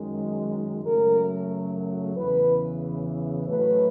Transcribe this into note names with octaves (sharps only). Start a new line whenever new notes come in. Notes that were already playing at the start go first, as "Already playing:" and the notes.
Already playing: F#2 D#3 G#3
F#2 C#3 F#3 A3 A#4
E2 C#3 E3 B4
A2 F#3 A3 B4